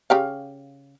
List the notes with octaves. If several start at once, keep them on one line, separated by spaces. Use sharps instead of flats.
C#3 G4 F5